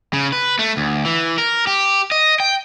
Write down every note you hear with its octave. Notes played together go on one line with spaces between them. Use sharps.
C#3
B4
A3
D2
E3
A#4
G4
D#5
G5